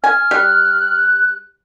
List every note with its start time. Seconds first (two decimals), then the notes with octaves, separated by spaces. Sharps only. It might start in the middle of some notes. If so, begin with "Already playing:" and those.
0.04 G#5 F6
0.31 G3 F#6